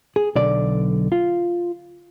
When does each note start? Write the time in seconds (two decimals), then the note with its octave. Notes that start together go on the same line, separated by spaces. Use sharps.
0.16 G#4
0.35 B1 D3 D5
1.12 F4